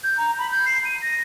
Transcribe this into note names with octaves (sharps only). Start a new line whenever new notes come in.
G6
A#5
B5
G6
C7
D#7
A#6